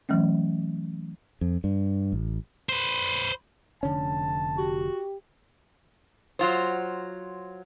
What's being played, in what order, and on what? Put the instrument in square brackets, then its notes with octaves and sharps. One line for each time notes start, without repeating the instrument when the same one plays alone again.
[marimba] E3 F#3 A3 C#4
[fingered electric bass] F2
G2
A1
[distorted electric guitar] B4 C5
[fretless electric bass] F1 D3 C#4 [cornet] A5
[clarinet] F#4 [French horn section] G4
[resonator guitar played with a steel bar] F#3 F4 C5